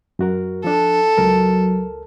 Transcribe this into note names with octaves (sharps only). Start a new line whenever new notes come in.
F#2 F#4 A#4
F3 D4 A4
C#2 F#3 A#4